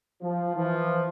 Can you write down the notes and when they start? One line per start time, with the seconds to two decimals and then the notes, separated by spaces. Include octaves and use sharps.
0.21 F3
0.54 E3 F3